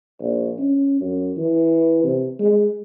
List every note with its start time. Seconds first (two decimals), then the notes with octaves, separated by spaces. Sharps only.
0.21 A#1
0.59 C#4
1.01 F#2
1.37 E3
2.04 C3
2.39 G#3